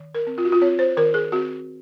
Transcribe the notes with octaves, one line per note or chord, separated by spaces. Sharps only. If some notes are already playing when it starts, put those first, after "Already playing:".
Already playing: D#3
A#4
C4
F4
F#4
F4
C4 C#5
C5
D#3 A#4
G#4
C4 F#4